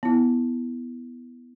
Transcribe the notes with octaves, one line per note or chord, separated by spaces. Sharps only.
B3 E4